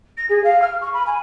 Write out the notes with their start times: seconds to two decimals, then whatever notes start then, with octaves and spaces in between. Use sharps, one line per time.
0.17 A#6
0.29 G#4
0.44 F5
0.62 F6
0.81 C#6
0.93 B5
1.07 G#5